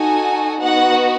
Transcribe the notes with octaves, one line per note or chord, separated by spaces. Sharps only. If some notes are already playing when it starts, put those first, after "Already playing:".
Already playing: D#4 F#4 A4 G#5
B3 D#4 F#4 F#5